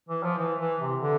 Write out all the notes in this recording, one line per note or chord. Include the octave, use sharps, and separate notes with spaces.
E3
F3
E3
E3
C3
D3